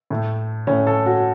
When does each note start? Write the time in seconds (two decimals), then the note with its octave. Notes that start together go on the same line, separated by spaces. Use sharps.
0.10 A2 A3
0.67 A2 A3 C#4
0.87 A4
1.06 F#4